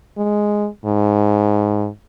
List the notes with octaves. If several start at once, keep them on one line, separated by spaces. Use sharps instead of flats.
G#3
G#2